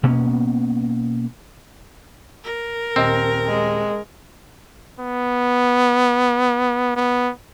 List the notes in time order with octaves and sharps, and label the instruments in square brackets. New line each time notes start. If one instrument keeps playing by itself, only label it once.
[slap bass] B2 A#3 B3 C#4
[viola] A#4
[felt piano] D#1 D#5 [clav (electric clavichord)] C4
[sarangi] G#3
[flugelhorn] B3
B3